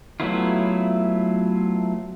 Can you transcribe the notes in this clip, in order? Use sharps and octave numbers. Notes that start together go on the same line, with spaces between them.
F#3 A3 B3 E4 F4